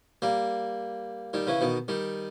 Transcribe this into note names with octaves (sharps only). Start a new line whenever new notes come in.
G3 A#3
D#3 G3
C#3 E3
B2 D#3
D#3 G3